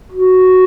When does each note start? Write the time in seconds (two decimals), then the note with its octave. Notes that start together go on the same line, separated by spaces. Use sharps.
0.12 F#4